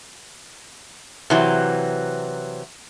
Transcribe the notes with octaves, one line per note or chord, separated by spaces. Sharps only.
C3 E3 F#3